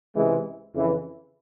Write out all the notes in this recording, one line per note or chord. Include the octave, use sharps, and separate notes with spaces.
C#2 C3 E3 G#3
F2 C#3 E3